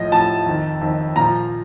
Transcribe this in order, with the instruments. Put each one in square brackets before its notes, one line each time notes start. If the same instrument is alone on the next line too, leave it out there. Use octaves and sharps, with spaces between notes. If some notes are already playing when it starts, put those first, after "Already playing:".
Already playing: [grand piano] A2 F3 D#5
A2 F3 A5
F2 D#3
F2 D#3
A#2 F3 A#5